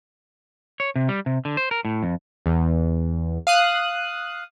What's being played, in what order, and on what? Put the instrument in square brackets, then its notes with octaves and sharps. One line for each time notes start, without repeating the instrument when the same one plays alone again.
[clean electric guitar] C#5
C3
G3
C3
D3
C5
A#4
A2
F2
[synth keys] E2
F5 D#6 F#6